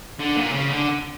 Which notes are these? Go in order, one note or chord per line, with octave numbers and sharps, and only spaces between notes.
D3
A#2
C#3
D3